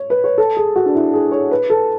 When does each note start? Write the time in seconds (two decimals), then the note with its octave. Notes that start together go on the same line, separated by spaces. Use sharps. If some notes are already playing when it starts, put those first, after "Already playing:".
Already playing: C#5
0.10 B4
0.24 C#5
0.38 A4
0.57 G#4
0.76 F#4
0.86 D4
0.95 E4
1.13 G#4
1.32 C#5
1.51 B4
1.70 A4